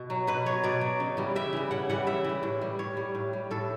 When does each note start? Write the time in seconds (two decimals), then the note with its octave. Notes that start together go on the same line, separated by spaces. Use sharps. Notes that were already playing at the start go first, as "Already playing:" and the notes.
Already playing: B2
0.10 F#3
0.27 B2 B4
0.46 F#3 C#5
0.63 B2 D5
0.81 F#3
1.00 C#3
1.17 E3 G3
1.36 C#3 E5
1.53 E3 G3
1.71 C#3 F#5
1.90 E3 G3 F#5
2.07 C#3 E5
2.24 E3 G3
2.43 A2
2.62 G3
2.79 A2 C#5
2.97 G3
3.15 A2
3.33 G3
3.51 A2 A4